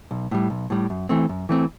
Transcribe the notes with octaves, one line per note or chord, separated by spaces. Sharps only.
B1
A2 G3
B1
A2 G3
F#2
E3 A3 C4
F#2
E3 A3 C4